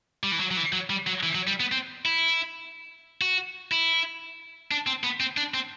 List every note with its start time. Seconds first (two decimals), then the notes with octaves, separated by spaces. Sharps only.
0.24 G3
0.32 E3
0.40 F#3
0.51 F#3
0.57 E3
0.73 F#3
0.90 G3
1.07 F#3
1.23 E3
1.35 F#3
1.47 G3
1.60 B3
1.72 C4
2.05 E4
3.21 F#4
3.72 E4
4.71 D4
4.87 C4
5.04 B3
5.20 C4
5.37 D4
5.54 C4